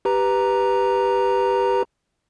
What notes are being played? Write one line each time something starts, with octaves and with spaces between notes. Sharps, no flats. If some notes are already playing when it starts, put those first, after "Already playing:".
G4 B4 A#5